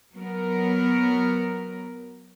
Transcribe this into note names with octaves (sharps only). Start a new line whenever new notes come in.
F#3 B3 A#4